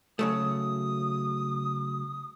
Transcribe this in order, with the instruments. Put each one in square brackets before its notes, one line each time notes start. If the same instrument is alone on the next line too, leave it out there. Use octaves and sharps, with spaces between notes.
[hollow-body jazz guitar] C#3 F#3 A3 [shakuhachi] D#6